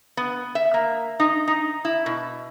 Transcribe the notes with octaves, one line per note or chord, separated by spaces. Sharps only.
B3
E5
A#3
D#4
D#4
E4
B2